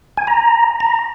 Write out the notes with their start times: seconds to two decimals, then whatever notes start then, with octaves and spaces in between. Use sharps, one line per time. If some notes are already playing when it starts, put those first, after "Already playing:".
0.17 G#5
0.27 A#5
0.80 A#5